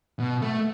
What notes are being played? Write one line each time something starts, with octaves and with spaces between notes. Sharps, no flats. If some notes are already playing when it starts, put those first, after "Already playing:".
B2
A3